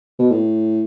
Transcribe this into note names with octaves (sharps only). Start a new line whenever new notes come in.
B2
A2